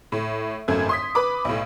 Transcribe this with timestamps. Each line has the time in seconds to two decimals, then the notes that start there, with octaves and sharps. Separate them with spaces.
0.12 A2
0.68 G#1 F#2 A3 G#6
0.89 C6 D#6 B6
1.15 B4 B5 D6
1.45 B1 A2